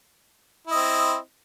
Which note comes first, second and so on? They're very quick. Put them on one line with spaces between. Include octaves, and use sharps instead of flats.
E4 D#5 C4